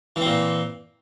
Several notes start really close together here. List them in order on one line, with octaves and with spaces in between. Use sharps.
E3 C4 A#2